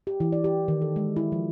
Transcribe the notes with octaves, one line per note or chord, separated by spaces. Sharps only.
G4
E3
D5
G4
D#3
A4
G#3
E4
F3